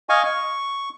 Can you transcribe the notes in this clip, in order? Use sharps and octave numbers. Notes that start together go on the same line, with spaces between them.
D#5 F5 G#5 C#6
C#6